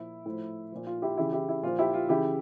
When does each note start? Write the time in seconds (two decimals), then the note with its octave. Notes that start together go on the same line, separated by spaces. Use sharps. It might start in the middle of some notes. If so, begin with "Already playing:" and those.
Already playing: A#2 F3 E4
0.26 A2 F3
0.72 A#2 F3
0.87 F4
1.02 E4 G4
1.17 C#3 E3 E4 G4
1.33 E4 G4
1.49 E4
1.63 A#2 F3 F4
1.79 E4 G4
1.94 F4
2.09 C#3 E3 E4 G4